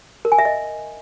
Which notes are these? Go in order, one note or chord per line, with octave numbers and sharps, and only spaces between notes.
A#4
G#5
E5
D#5